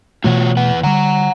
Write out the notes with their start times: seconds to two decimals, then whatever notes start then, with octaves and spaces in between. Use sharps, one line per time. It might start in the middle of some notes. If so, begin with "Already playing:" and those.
0.24 B2 E3 A3 F4 F#4 C#5
0.57 E2 B4 F#5
0.83 D3 G3 F#5 A#5